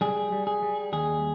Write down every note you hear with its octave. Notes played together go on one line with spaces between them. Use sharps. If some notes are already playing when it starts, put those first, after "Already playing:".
G3 G#4
G3
G#4
G3
D#2 G#4